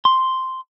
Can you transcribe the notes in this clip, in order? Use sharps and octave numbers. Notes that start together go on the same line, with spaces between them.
C6